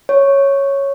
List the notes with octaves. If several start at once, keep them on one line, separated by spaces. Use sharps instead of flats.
C#5